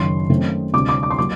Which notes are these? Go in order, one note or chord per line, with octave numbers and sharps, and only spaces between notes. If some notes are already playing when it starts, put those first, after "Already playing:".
Already playing: F#1 F#2 D#3 C6
F#2 D#3 A3 C4
D2 C3 G3 D6
D6
D6
C6
F#3 A#3 D6